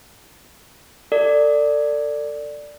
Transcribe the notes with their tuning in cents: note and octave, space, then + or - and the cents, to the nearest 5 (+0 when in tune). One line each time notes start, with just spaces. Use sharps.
A4 +35 D5 +0